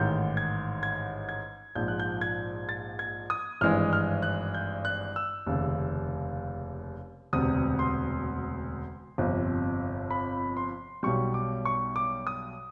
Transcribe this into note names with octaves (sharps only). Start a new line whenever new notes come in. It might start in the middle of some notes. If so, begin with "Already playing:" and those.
Already playing: A1 G#2 D#3 G6
G#6
G#6
G#6
A#1 G#2 F3 G6
F#6
G6
G#6
A6
G#6
D#6
G#1 G2 E3 G#3 F6
F6
F#6
G6
F#6
E6
F1 D#2 C#3
E1 D2 C3 D#6
C6
G1 F2 C3
B5
C6
B1 B2 G3 C#6
D6
C#6
D6
D#6